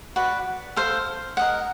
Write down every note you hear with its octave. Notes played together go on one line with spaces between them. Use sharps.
F#4 B4 D5
A4 C5 F5
A#4 D#5 F#5